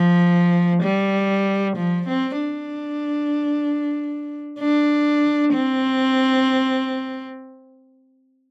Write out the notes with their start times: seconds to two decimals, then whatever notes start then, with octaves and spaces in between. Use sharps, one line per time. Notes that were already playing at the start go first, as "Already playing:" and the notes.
Already playing: F3
0.83 G3
1.77 F3
2.08 C4
2.40 D4
4.60 D4
5.54 C4